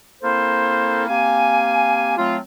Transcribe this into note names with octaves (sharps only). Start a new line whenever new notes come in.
A#3 C4 E4 A4 A#4 C5
A#3 C4 G4 F5 G#5
F#3 A3 C4 F4